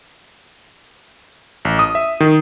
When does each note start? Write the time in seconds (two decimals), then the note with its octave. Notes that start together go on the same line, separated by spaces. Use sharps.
1.65 A1
1.79 D#6
1.95 E5
2.20 D#3